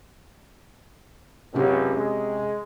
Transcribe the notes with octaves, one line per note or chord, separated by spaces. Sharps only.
C#2 F#2 C3 C#4 G4
G#3